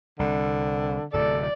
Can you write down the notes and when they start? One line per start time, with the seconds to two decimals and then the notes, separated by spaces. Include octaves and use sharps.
0.19 C2 D3
1.13 D1 A2 C3 A4 D5